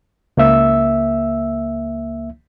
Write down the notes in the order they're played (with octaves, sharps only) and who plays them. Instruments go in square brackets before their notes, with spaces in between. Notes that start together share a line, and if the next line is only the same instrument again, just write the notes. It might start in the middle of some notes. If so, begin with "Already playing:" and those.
[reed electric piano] C#2 A#3 E5 E6